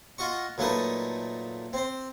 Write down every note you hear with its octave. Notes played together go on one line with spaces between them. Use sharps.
F4 F#4 D#5 C#6
A#2 F#3 A3 D#4 B4 D#6
C4 C5